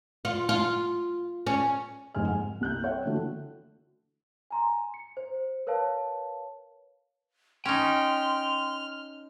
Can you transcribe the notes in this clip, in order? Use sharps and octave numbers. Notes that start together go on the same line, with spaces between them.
F4
F4
C#4
F1 G#2 G#3 C4 G#5 F6
F#5
C2 F#6 G6
C#5 E5 F#5 G5
D3 E3 A3 F#4
G#5 A#5 C6
C#7
C5
A#4 B4 C#5 F5 A5
C#4 D#4 G5 C6 F6